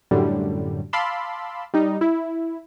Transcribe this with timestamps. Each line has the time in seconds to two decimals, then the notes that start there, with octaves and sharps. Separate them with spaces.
0.11 F#2 A2 D3 F#3 G3
0.93 F5 A5 B5 C6 D6 E6
1.74 G3 D#4
2.01 E4